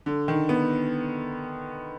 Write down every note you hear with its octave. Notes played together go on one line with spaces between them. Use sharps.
D3
D#3
B3